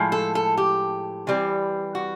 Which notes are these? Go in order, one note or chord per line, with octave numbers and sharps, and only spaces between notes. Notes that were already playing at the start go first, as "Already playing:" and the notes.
Already playing: A2 F3 G#3
A4
A4
G4
E3 G3 C4
F#4